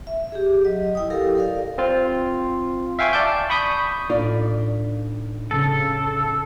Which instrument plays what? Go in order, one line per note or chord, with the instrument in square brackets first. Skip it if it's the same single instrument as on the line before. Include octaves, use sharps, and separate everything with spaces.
[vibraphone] E5
G4 G#4
F#3 D#5
E4 G5 D#6
G4 A4 A#4 F5
A4 A#4 D5 F5
[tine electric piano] C4 F4
E5 F5 G5 G#5 C#6
D5 A5 D6 G6
B5 C#6 D#6 G6 B6
[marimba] A2 D4 [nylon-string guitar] D#4 F4 D5
[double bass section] C#3 [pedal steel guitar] A4